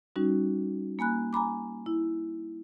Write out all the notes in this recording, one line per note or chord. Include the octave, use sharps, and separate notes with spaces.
G3 C#4 D#4 F#4
A#3 G#5 B5 F#6
G#5 A#5 B5 D6
E4